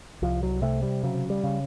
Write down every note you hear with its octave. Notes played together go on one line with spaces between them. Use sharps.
C2 F3
F#3
C3 A3
G3
C#3 F#3
G3
C#3